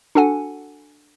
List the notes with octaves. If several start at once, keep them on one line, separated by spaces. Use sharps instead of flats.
D4 F#4 A4 F#5 G#5